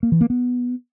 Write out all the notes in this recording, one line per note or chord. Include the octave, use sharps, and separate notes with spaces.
A#3
E3
A#3
B3